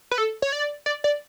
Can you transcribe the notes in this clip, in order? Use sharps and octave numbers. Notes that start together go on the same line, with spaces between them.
B4
A4
C#5
D5
D5
D5